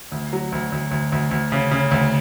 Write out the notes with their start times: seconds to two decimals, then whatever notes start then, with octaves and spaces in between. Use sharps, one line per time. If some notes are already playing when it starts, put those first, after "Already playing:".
0.12 D2
0.33 F#3
0.52 D2
0.72 D2
0.91 D2
1.12 D2
1.31 D2
1.52 C#3
1.71 C#3
1.91 D2